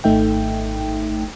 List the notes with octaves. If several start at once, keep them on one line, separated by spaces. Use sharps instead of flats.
G#1 A3 D#4 E5 G5